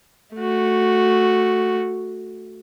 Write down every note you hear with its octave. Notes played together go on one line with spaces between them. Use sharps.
A3 F#4